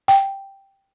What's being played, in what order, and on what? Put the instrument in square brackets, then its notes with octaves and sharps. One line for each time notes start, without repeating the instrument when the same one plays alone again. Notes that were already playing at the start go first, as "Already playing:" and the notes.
[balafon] G5